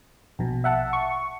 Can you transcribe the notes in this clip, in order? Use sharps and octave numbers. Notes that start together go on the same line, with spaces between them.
A#1 B2
E5 F#5 A5
C#6